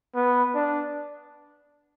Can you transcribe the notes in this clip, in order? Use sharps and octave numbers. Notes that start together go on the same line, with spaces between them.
B3
D4